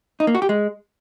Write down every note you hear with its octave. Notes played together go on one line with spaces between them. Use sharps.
D#4
A#3
F#4
G4
G#3